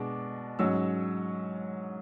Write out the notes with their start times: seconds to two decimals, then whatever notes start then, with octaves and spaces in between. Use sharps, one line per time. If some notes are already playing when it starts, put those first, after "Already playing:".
Already playing: B2 G#3 D4 D6
0.59 G#2 F#3 C#4 E6